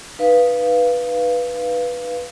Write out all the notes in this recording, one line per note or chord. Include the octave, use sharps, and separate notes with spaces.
D#4 B4 F5